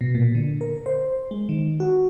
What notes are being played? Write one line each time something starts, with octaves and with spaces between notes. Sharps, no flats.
B2
A#2
D3
A#4
C5
G#3
D#3
F#4